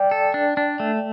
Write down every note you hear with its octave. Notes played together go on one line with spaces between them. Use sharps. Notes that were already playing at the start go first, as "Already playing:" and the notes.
Already playing: D5 G5
A4
D4
D4
A3